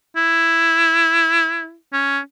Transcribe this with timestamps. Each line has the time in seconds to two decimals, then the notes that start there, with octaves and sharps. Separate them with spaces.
0.17 E4
1.93 C#4